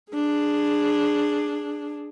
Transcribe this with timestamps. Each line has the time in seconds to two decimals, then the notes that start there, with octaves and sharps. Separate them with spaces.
0.12 D4 G#4